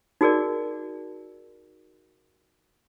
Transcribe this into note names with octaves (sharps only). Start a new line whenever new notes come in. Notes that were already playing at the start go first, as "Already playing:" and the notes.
D#4 F#4 G#4 A#4 D5